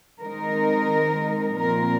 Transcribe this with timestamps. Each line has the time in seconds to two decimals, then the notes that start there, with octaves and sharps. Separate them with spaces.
0.20 D#3 G#3 C4 D#4 A#4
1.58 A#2 F3 C4 A#4